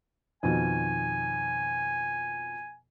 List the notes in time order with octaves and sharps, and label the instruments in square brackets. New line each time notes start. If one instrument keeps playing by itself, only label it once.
[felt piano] F2 B2 D#3 [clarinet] G#5